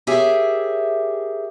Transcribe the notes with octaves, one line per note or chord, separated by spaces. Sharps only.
G4 G#4 A#4 C#5 E5 G#5